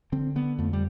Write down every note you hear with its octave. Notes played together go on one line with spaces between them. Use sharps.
D3 C4
D3 B3
F2 A3
G3